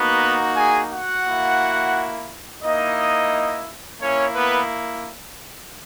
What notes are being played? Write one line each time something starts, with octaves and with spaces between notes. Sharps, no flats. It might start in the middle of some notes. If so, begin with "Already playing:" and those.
Already playing: A#3 B3 D#4 F#4 B4
G#4 G#5
F#4 F#5
A#3 E4
A#3 D#4 E4 D#5
A#3 C#4 E4 C#5
B3 B4